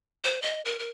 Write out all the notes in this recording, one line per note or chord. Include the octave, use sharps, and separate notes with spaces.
C5
D#5
A#4
A#4